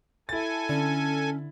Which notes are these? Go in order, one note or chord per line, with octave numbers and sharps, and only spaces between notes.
E4 A4 G#5 A6
D3 C#4